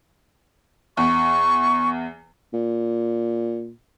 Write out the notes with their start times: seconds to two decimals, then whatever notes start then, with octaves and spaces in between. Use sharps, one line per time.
0.97 E2 C#6
2.53 A#2